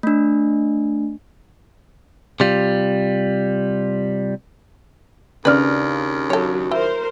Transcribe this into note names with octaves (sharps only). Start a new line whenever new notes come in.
A3 D4
C3 G3 F4
D#2 C#3 D4 B4 D5 F6
F#3 A4 C#5
E4 A#4 C5